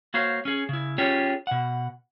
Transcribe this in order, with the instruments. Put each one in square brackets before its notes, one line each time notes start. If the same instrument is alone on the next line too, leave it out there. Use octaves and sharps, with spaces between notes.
[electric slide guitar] A#3 F#4 C5 C#5 F5
C#4 G#4
C#3 E4
C#4 F4 G4 G#4 C#5
B2 F#5